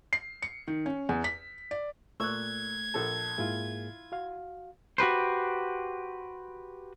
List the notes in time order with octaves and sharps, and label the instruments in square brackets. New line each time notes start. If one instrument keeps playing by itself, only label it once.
[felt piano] C7
C#7
D#3
C#4
E2
B6
D5
[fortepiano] A#2 C#6 E6 [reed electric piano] A3 F#6 [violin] G#6
[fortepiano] A#1 A4 A5
[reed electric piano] G#2 A#3 G#4 [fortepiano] E4 F4
[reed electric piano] F#4 F5
[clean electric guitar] F#4 G4 B4 C5